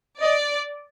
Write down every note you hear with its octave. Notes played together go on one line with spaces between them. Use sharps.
D5 D#5